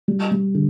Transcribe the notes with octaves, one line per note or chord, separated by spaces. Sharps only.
G3
G3
D3